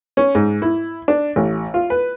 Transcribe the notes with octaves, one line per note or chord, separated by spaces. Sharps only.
C#4
G#2
E4
D4
A1
F4
B4